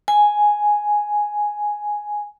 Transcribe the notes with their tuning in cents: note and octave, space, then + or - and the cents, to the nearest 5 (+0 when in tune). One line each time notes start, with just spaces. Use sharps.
G#5 +0